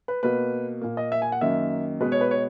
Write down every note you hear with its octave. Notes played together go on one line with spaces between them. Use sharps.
B4
B2 A#3 B4
A#2 A#3
D#5
E5
G#5
F#5
F#2 D#3 A#3 E5
B2 G#3 B3 B4
C#5
B4
C#5